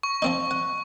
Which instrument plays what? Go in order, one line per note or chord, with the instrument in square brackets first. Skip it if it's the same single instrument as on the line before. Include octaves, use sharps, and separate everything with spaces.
[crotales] C#6
[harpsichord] F3 C4 D#4
F#5